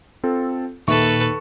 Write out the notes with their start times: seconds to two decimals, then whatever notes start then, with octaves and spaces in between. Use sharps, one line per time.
0.24 C4 F4 A4
0.88 D#2 A#2 D#3 A4 B4 E5 C#6